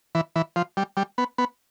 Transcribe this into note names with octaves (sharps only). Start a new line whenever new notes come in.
E3
E3
F3
G3
G3
B3
B3